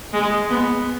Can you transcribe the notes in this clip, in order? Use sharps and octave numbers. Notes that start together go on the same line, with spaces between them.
G#3
B3